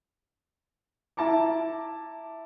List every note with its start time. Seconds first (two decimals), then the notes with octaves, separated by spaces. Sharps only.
1.17 E4 A5 A#5 D6